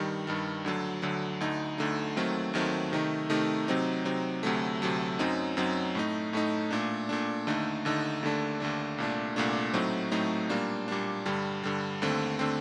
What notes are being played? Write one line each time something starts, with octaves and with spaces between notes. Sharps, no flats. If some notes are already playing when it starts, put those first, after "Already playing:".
Already playing: G2 D#3 G3
G2 D#3 G3
D2 D3 F#3
D2 D3 F#3
D2 D3 A3 D#4
D2 D3 A3 D#4
D#2 D#3 F#3 A3 C4
D#2 D#3 F#3 A3 C4
C3 D#3 A3 D#4
C3 D#3 A3 D#4
C3 F#3 C4 D#4
C3 F#3 C4 D#4
D2 C3 F#3 A3
D2 C3 F#3 A3
F#2 F#3 C4 D#4
F#2 F#3 C4 D#4
A2 A3 D#4
A2 A3 D#4
A#2 A3 D4
A#2 A3 D4
D#2 D3 A3 D#4
D#2 D3 A3 D#4
D#2 D3 A3 D4
D#2 D3 A3 D4
C2 A#2 A3 D4
C2 A#2 A3 D4
A2 F#3 A3 C4 D#4
A2 F#3 A3 C4 D#4
A#2 G3 A#3 D4
A#2 G3 A#3 D4
G2 D3 G3
G2 D3 G3
D#2 D3 A3 C4
D3 A3 C4